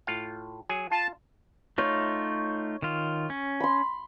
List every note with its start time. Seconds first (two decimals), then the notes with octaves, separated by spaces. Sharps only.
0.07 A2 F4 F5
0.69 F#3 G#4 G#5
0.92 F4 A5
1.78 A3 D#4 F4 C#5
2.82 D#3 F4
3.30 C#4
3.60 B5 C6